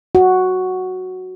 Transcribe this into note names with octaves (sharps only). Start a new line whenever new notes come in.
F#4